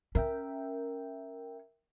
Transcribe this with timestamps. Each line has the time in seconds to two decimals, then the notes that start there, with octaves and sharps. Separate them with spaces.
0.15 C#4 A#4 E5 G5